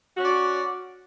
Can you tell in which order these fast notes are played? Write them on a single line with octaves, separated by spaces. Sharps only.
F#4 C#4 D5